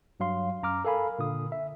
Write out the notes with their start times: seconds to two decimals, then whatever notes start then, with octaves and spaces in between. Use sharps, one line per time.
0.20 G2 F#3 F5 C6
0.63 F#2 A#5 D6 F6
0.85 A4 A#4 F5 G#5 B5
1.19 A#2 D3 D#6
1.52 E5